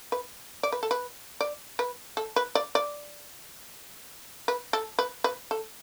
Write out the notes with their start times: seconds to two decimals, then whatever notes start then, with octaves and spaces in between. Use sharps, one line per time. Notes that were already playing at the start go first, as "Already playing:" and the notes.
0.12 B4
0.63 D5
0.72 B4
0.83 A4
0.91 B4
1.41 D5
1.79 B4
2.17 A4
2.36 B4
2.55 D5
2.75 D5
4.48 B4
4.73 A4
4.99 B4
5.24 B4
5.51 A4